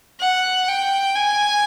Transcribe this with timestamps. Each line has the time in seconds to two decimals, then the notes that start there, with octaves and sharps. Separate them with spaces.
0.20 F#5
0.68 G5
1.16 G#5